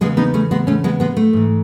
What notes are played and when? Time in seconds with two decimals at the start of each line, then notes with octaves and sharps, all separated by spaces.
0.01 E2 C#3 E3 G#3 B3
0.17 B3 D#4
0.34 A3 C#4
0.51 G#3 B3
0.67 A3 C#4
0.84 G#3 B3
1.00 G#3 B3
1.17 A3
1.33 G#2 E3